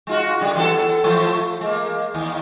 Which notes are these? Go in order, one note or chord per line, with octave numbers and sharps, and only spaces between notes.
G#3 F4 F#4
D3 G3 D4
E3 B3 A4
E3 F3 A3
G#3 A#3
D#2